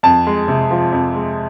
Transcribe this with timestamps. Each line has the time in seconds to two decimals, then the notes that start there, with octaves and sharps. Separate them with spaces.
0.03 F2 A5
0.27 G#3
0.48 C3
0.71 F3
0.92 F2
1.15 G#3